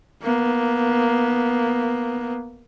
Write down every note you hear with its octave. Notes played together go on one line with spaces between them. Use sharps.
A#3 B3